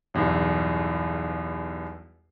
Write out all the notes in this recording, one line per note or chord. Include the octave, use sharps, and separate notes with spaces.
B1 E2 G2